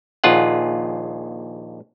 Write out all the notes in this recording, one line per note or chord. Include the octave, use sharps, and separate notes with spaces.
A#1 D#2 F4 G#4 F#5